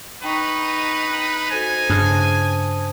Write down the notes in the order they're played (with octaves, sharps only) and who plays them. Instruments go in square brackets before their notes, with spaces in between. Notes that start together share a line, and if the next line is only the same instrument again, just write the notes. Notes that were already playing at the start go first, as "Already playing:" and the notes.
[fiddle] D#4 [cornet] B4 [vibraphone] G5 C#6
[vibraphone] F#4 A4 C5 [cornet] G#5
[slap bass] G2 C#3 [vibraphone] C5 A5 D#6